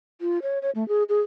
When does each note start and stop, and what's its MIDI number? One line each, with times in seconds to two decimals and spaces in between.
0.21 0.39 65
0.42 0.59 73
0.62 0.70 73
0.75 0.87 57
0.88 1.03 68
1.09 1.20 68